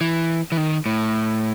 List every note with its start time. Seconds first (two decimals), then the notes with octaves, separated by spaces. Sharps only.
0.01 E3
0.52 E3
0.57 D#3
0.86 A2